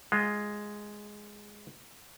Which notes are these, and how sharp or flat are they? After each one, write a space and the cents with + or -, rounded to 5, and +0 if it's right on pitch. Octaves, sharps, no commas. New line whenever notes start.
G#3 +0 F4 +0